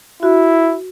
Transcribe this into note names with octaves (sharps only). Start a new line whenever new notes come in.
E4 F#4